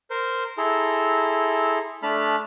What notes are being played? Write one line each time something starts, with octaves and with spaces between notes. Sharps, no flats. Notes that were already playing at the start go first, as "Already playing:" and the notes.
A#4 C5 C6
E4 G#4 A4 A#5 C6
A3 D4 A5 B5 F6